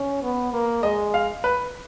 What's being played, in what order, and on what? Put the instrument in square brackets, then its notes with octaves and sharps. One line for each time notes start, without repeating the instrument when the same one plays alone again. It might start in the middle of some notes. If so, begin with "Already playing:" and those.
Already playing: [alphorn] C#4
B3
A#3
[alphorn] G#3 [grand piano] D#5
[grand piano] F5
B4